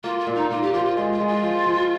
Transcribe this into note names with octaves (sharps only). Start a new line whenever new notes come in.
A#3 F4
F4
A#2
D#4
A#3 F4
G4
F3 F4
F4
G#3 F4
F4
G#3
F4
F3
F3